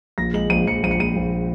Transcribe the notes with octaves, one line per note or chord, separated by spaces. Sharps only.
A#1 A#6
G#3 F#7
A#1 D#7
A#1 C#7
A#1 D#7
C#7
A#1 D#7
A#1